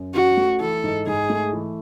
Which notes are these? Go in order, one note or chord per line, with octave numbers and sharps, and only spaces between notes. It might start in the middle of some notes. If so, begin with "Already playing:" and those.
Already playing: F#2
C#4 F#4
A3
E3 A4
G#2
G#2 G#4
A3
E3